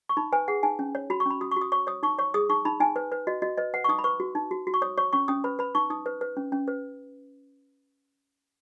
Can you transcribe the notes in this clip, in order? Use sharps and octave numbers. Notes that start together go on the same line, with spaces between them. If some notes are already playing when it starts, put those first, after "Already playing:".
C#6
D#4 B5
B4 G#5
G#4 F#5
D#4 G#5
C#4
C#5
F#4 B5
C#6
C#4 B5
F#4 D#6
C#6
F#4
D#6
C#5 C#6
C#5 D#6
D#4 C#6
C#5 C#6
G#4 D#6
D#4 C#6
D#4 B5
D#4 G#5
B4
B4
F#4 D#5
F#4 D#5
B4 D#5
B4 F#5
C#6
D#4 D#6
B5
B4 C#6
F#4
D#4
F#4
F#4
C#6
C#5 D#6
C#5 C#6
C#4 C#6
C#4 D#6
B4 B5
B4 B5
D#4 C#6
D#4 D#6
B4
B4
C#4
C#4
B4